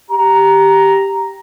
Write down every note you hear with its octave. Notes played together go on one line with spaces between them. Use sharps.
G4 A#5